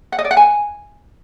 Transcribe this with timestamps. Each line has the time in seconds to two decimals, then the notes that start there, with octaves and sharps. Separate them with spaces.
0.12 F#5
0.19 D#5
0.25 D5
0.31 F#5
0.37 G#5